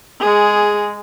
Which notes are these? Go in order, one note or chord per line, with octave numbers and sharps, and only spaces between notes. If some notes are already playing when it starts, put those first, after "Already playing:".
G#3 G#4